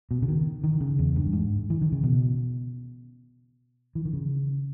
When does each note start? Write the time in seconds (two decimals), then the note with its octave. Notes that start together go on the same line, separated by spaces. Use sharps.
0.11 B2
0.22 C#3
0.28 D#3
0.64 D#3
0.81 C#3
0.99 E2
1.16 G2
1.33 G#2
1.70 E3
1.81 D#3
1.92 C#3
2.03 B2
3.95 E3
4.05 D#3
4.13 C#3